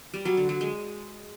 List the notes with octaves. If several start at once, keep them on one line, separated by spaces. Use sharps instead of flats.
G3
F#3
D3
F#3
G#3